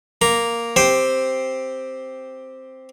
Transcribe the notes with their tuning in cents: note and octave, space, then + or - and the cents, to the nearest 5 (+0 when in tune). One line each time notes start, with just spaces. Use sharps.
A#3 +0 A#5 +0
C4 +0 G4 +0 C5 +0